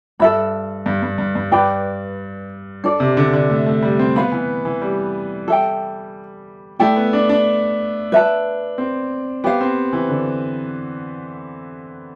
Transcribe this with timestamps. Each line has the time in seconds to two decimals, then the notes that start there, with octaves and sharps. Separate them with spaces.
0.20 G2 A4 E5 B5
0.86 G2
1.02 G2
1.18 G2
1.35 G2
1.51 G2 B4 D5 G5 B5
2.84 D4 A4 D5
3.00 C3
3.17 D3
3.33 D3
3.50 A3
3.66 A3
3.82 G3
3.99 C4
4.16 B3 B4 F5 B5
4.32 E3
4.65 E3
4.82 G3
5.48 A4 E5 G5
6.79 A3 E4 A4 D5 G5
6.96 B3
7.13 D4
7.29 D4
8.12 B4 E5 A5
8.78 C4
9.44 B3 G4 C5 F5
9.61 C4
9.93 E3
10.09 D3